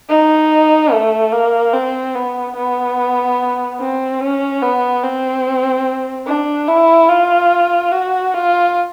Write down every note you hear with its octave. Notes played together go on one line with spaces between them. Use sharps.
D#4
A3
A#3
C4
B3
B3
C4
C#4
B3
C4
D4
E4
F4
F#4
F4